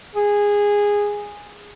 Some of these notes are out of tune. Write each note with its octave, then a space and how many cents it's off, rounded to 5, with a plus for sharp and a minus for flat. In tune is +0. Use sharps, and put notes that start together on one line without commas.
G#4 -15